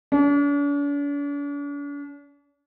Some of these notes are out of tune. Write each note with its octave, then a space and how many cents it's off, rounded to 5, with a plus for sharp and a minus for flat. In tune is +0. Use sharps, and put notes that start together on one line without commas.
D4 -45